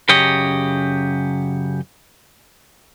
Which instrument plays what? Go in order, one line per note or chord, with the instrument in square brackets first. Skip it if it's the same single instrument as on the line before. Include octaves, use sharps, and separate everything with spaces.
[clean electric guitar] F#2 C#3 G4 C#5 D#5